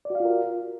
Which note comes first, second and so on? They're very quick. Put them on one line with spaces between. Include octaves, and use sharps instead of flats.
D5 F#4 F5 F4 A#4